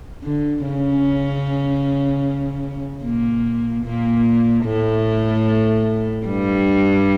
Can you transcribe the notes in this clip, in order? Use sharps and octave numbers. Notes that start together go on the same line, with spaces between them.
D3
C#3 C#4
A#2 A#3
A#2 A#3
A2 A3
G2 G3